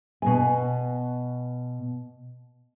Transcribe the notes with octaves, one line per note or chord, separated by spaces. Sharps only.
B2 G#5